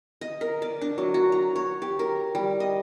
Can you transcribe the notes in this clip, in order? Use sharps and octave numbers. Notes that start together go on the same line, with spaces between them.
D#5
A#4
D5
D4
F#3
F#4
A#5
C#5
G4
A#4
G3
D#5